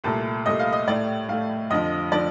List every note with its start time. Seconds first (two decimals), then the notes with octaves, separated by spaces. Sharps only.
0.04 C2 A#2 A3 A5
0.46 C2 A#2 A3 D#5
0.60 F5
0.73 D#5
0.87 A2 A3 D5
1.28 A2 A3 F5
1.70 F2 D3 F3 D#5
2.12 D3 F3 D5